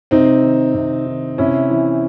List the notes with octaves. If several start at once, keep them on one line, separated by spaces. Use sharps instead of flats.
C3 C4 D#4
D#3
C3
D#3
C3 C#4 E4
E3